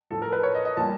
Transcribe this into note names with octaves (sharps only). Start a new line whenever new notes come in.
A2 F3 A3 A4
A#4
B4
C#5
D#5
D#5
A#2 G3 A#3 A5